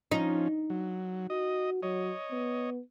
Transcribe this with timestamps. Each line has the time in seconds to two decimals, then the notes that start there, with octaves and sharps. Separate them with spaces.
0.11 F3 C#4 D#4
0.70 F#3
1.30 F#4 D#5
1.83 F#3 C#5 D#5
2.31 B3